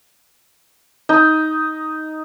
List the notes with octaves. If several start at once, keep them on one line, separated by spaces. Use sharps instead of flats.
D#4